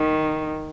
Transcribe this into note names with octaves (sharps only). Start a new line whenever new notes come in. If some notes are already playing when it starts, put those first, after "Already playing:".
Already playing: D#3